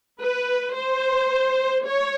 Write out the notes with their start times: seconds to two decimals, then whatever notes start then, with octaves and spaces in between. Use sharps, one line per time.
0.20 B4
0.76 C5
1.86 C#5